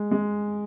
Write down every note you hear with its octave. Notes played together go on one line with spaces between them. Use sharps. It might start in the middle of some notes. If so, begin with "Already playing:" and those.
Already playing: G#3
G#3